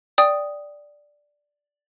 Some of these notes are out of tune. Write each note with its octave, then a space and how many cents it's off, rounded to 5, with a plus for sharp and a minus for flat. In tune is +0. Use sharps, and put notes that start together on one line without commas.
D5 +0 G5 +0 D#6 +0